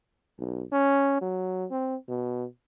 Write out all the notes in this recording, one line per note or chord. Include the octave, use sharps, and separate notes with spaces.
B1
C#4
F#3
C4
B2